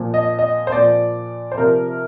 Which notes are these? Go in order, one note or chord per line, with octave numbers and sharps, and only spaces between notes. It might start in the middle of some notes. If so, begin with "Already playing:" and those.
Already playing: A#2 F3
D#5
D#5
C5
A#2 F3 D5
C5
C3 F3 A#4